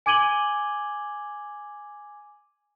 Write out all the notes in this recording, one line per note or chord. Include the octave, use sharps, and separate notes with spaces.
G#5 D6 G#6 D#7 F#7 G7